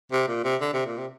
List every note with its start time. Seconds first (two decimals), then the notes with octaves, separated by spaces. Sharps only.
0.12 C3
0.28 A#2
0.44 C3
0.61 D3
0.73 C3
0.86 A#2
0.98 C3